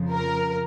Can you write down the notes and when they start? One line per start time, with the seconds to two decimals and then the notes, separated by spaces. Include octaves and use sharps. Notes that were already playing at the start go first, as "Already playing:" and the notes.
Already playing: F2 C#3 F3
0.12 A#4